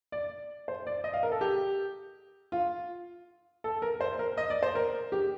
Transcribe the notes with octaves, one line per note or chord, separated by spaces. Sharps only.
D5
C5
D5
D#5
F5
A#4
A4
G4
F4
A4
A#4
C5
A#4
D#5
D5
C5
A#4
G4